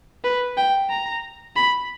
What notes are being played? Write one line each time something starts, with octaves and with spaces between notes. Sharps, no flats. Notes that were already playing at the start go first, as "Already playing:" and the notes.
B4
G5
A#5
B5